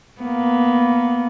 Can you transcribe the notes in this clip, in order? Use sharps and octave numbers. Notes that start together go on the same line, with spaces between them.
A#3 B3